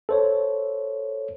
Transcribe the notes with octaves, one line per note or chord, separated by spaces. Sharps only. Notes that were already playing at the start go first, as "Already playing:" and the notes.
A4 C5 C#5